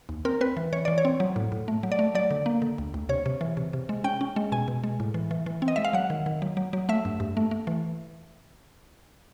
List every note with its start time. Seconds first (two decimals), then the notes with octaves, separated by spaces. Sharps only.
0.09 D#2
0.25 C4 A#4
0.41 C4 B4
0.57 E3
0.73 E3 C#5
0.85 E3 D5
0.98 C#5
1.05 C4
1.20 F#3
1.36 A2
1.52 A2
1.68 A3
1.83 F#3
1.92 D5
1.99 A3
2.15 F#3 D5
2.31 D3
2.46 A#3
2.62 D3
2.78 D2
2.94 D2
3.09 C3 C#5
3.26 C3
3.41 E3
3.57 C3
3.73 C3
3.89 G#3
4.04 C#4 G5
4.21 C#4
4.36 G#3
4.52 B2 G#5
4.68 B2
4.84 G#3
5.00 A2
5.14 E3
5.31 E3
5.46 E3
5.62 C4
5.68 D#5
5.76 G#3 E5
5.85 F5
5.93 F#3 F#5
6.10 D#3
6.26 D#3
6.42 F#3
6.57 F#3
6.73 F#3
6.89 A3 E5
7.05 G2
7.20 G2
7.37 A3
7.51 A3
7.67 E3